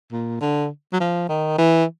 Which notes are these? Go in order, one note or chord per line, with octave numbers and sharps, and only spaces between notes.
A#2
D3
F#3
F3
D#3
E3